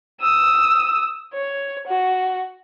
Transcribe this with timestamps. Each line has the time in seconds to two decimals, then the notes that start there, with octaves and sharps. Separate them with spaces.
0.20 D#6 E6
1.34 C#5
1.87 F#4